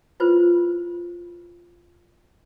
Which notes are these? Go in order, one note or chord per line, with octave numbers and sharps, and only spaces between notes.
E4 F4 B4 C5